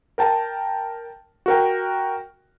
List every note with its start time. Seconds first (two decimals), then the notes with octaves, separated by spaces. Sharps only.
0.18 A#4 G5 A5
1.46 F#4 A#4 G5